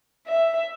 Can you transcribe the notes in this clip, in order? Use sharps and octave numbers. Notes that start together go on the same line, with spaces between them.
E5